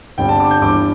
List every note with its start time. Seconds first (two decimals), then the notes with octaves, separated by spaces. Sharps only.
0.18 G1 G2 D3 G3 C4 G5
0.29 A5
0.40 D6
0.51 G6
0.62 G1 G2 E3 D6